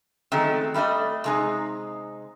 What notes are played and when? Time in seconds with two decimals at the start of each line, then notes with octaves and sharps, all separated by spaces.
0.32 D#3 F#3 G#3 A3 C4
0.74 G3 A3 A#3 D4 D#5
1.24 C3 G#3 D#4